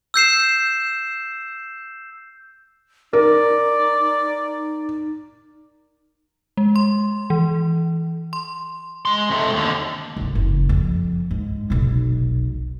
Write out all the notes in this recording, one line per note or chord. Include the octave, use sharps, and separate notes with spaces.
E6 G6 C7 E7
D#4 A#4 D5
G#3
C6
E3
C6
G#3 C6
C3 A3
D#2 D3
D1 G#1
F#1
F2
G#2
F1 B1